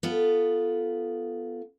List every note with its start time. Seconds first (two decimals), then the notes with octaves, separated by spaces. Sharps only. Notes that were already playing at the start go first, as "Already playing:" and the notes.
0.03 B3 F4 A4